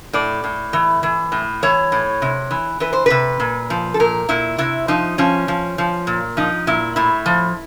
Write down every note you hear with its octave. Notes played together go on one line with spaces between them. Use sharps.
A2 D5
A2
E3
E3
A2
E3 C#5
A2
C3
E3
E3 B4
C5
C3 B4
A#2
F3
A4
A#2 A#4
A#2 E4
C3 E4
F3 D#4
F3 C#4
F3
F3
A#2
F3 D#4
A#2 E4
A2 E4
F3